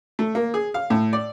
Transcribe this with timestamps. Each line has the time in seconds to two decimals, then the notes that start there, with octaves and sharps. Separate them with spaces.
0.19 A3
0.35 A#3
0.54 G#4
0.74 F5
0.90 A2
1.13 D5